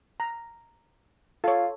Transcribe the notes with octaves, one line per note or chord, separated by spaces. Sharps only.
A#5
F4 A4 C#5